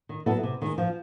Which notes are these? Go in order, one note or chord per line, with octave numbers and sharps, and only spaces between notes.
D#3
F#3 B3 E4 A4
C3
D#3 G#3
F3